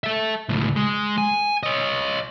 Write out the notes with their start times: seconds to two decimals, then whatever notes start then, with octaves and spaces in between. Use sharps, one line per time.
0.04 A4 E5
0.49 C#2 A2
0.76 G#3
1.18 G#5
1.63 C#5 D#5